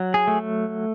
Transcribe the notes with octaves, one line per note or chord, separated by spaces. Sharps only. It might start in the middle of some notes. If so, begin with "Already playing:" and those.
Already playing: F#3
G#4
A3